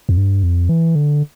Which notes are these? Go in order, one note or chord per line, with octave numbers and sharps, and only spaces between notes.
F2
G2
F2
E3
D3